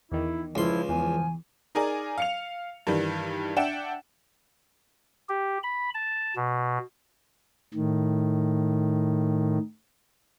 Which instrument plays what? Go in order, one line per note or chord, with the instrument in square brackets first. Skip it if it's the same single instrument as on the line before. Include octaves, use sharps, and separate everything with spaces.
[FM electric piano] E2 D#3 [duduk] E4
[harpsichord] C#2 C6 [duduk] F3 [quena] E4
[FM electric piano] E2 [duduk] F3 [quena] G#5
[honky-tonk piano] D#4 G#4 A#4 D5 G#5
F5 C#7 F7
G2 D#3 E3 G3
D4 E5 F#5 G5 E7
[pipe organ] G4
B5
A5
B2
A2 D#3